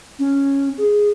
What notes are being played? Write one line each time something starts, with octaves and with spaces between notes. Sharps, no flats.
C#4
G#4